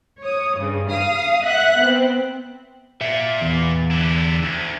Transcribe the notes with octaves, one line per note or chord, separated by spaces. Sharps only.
C#5 D#6
G2 C#3
F5 D#6
E5 F#5 F#6
B3 C4
A#2 E5
E2
D3 E4
D2